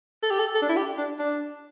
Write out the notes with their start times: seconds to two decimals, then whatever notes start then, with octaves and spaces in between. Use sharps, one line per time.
0.23 A4
0.31 G4
0.40 A4
0.55 A4
0.62 D4
0.69 E4
0.76 G4
0.98 D4
1.19 D4